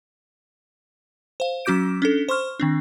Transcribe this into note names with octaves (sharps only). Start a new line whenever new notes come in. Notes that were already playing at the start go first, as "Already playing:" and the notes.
C5 F5
F#3 C#4 F#4 D6 G6 D7
C#4 D4 A4
C5 C6 C#6 F6
D#3 C4 D4